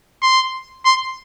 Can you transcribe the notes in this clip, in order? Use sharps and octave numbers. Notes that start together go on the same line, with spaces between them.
C6
C6